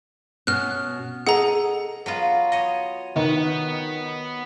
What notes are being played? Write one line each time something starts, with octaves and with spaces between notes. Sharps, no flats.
B2 C#4 F6 F#6
G#4 A4 D#5 F#5 A#5
F#3 B3 F4
C#5 D#5
D#3 B3